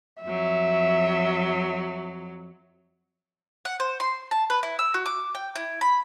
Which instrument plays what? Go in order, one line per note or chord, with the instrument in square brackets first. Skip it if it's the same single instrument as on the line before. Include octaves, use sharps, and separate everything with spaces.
[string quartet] F2 F#3 [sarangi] E5
[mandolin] F#5
C5
C6
A5
B4
E4
E6
F#4
D6
G5
E4
B5